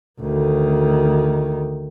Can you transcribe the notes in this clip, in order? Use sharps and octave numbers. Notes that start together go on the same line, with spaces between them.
D2 D#3